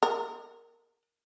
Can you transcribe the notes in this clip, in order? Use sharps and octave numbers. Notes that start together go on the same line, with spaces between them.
A#4